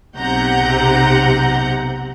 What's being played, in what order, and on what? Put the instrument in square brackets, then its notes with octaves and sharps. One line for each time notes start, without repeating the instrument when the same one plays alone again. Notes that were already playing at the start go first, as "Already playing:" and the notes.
[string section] B1 C3 F#5 A#5 G6